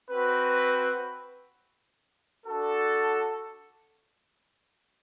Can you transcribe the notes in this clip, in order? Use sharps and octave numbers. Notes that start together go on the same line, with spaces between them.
C4 F#4 B4
D4 F#4 A4